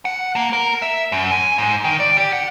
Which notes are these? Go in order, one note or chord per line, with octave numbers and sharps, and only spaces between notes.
F#5
A#3
A#4
E5
F#2
G#5
G#2
D#3
D5
G4
F#5